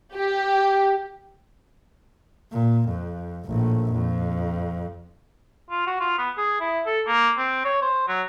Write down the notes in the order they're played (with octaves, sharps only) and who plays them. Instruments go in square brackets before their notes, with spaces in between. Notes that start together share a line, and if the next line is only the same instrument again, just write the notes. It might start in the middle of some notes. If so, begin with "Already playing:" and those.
[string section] G4
[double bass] A#2
F2
A#1 A2
F2
[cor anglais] F4
F#4
F4
B3
G#4
E4
A4
A#3
C4
C#5
C5
F#3